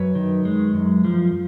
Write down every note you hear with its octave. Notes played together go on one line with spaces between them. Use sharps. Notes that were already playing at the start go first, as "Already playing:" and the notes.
Already playing: F#2 B4 C#5
D#3
G#3
F#2
F3